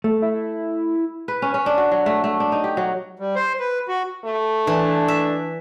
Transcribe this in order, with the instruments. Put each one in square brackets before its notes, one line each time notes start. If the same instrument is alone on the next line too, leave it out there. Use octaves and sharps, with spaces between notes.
[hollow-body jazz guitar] A3
[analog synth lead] E4
[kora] B4
C#4
C#4
D4
F#4
F#3
A3
A3
D4
D#4
G4
F#3
[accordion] G3
C5
B4
F#4
[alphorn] A3
[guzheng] E3 [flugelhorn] D4
[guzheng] E5